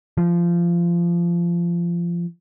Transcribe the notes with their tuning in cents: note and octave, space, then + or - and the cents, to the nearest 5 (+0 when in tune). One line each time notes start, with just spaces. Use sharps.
F3 -20